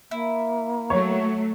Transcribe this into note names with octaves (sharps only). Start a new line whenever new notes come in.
A#3 E4
F#3 A3 C#5